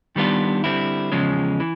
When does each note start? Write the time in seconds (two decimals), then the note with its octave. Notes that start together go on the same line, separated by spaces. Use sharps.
0.16 D#3 G3 B3 D4 F4
0.64 D3 G3 C4 E4
1.12 E2 C#3 F3 G#3 C#4
1.60 E3